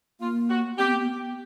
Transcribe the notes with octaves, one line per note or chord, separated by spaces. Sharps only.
A#3 F4
F#4
C4 G4
B3
A#3
B3